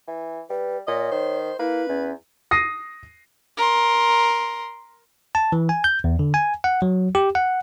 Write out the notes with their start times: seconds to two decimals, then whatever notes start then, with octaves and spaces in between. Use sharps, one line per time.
0.07 E3
0.50 G3 B4
0.87 A#2 C#5 D#5
1.12 D#3 C5
1.59 A#3 E4 B4
1.89 E2 C#4
2.51 D#6 A#6 C7 D#7
3.57 A#4 C6
5.35 A5
5.52 E3
5.69 G#5
5.84 G6
6.04 E2
6.19 D3
6.34 G#5
6.64 F#5
6.82 F#3
7.15 G4
7.35 F#5